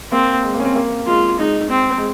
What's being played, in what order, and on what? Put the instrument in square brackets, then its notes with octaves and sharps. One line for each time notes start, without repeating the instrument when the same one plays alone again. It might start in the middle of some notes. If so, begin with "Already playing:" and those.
[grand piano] A#3 [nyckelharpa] C4
[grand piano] G#3
A#3
C#4
C4
A#3
[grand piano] G#3 [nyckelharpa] F4
[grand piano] G#3 [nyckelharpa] D#4
[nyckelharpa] C4
[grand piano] G#3